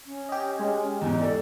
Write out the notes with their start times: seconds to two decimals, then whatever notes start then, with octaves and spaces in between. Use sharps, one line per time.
0.06 C#4
0.29 G4 D#5
0.59 G#3
1.02 E2 G#2
1.21 A4 D5